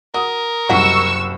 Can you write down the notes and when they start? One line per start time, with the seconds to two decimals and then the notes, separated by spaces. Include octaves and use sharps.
0.14 F#4 A#4 D#6
0.69 F#1 C2 C#4 F#4 D#5 C#6 E6